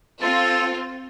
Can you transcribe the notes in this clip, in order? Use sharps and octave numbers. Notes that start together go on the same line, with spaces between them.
C4 F4 A4